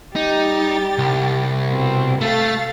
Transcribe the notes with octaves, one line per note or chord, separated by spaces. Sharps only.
G3 D#4 G4 A6
C2
B2 C4
A3 A4 F5 A6